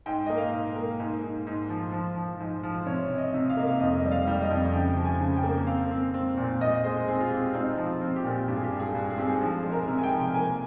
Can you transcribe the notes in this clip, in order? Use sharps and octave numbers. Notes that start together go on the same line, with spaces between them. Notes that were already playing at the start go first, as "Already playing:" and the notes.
G#2 G5
A#3 D#5
F5
G#2
A#3
G#2
G#2
G#2
F3
F3
F3
G#2
F3
C3 C#5
C3
D#5
C3
F5
A#3 D#5
F5
F2 D#5
G3 D#5
F5
G3
D#5
F2
C#3 G5
F3
G#5
C#3
G5
A#3
C4 F5
C4
C4
A#2
A#2 D#5
G#3 C5
C4 G#4
F4
C4 G4
F4
C4 D#4
F3
F4
C4
G4
A#2
G2 G4
G#4
G4
G2
G#4
G2
G#4
C4 G4
G#4
F3 G#4
G#3
A#4
C3
G#5
G5
F3
A#3 G#5